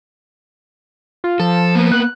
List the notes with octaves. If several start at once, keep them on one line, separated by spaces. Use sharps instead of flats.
F4
F3 A4
A#3 B3
F#6